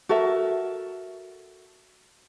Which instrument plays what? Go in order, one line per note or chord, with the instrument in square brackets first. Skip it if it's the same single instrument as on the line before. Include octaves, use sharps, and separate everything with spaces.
[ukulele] F#4 A4 A#4 E5